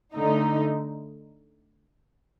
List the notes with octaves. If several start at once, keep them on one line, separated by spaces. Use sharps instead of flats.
D3 A3 D#4